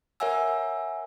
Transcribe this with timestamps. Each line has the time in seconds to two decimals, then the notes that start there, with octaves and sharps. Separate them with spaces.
0.20 A#4 C#5 E5 F#5 G#5 E6